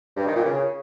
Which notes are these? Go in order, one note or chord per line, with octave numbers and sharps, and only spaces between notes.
G2
D#3
A#2
C#3